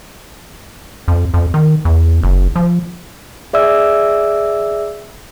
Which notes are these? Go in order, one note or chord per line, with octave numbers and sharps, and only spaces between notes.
F2
F2
D#3
E2
F#1
F3
G#4 D5 E5 E6